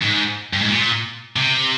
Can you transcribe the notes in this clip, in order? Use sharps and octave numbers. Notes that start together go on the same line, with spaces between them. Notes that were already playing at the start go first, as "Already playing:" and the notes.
G#2
G2
G#2
A#2
C3